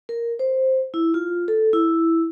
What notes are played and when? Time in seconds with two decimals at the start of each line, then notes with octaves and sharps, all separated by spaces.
0.09 A#4
0.39 C5
0.94 E4
1.14 F4
1.48 A4
1.73 E4